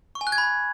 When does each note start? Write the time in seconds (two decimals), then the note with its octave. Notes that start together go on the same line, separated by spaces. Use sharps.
0.15 C#6
0.21 G#5
0.27 F#6
0.32 G#6
0.38 B5